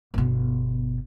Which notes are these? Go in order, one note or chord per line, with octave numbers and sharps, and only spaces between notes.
G1 B2